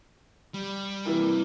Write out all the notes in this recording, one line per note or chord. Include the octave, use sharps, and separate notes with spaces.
G3
C3 E3 A#3 E4 A#4